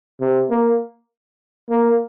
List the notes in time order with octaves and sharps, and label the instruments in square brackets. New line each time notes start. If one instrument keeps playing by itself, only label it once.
[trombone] C3
A#3
A#3